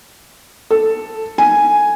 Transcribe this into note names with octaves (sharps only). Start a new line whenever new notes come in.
A4
G#5